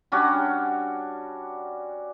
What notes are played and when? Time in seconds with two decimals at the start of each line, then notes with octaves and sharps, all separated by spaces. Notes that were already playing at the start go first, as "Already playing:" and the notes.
0.12 G3 C#4 D4 F#4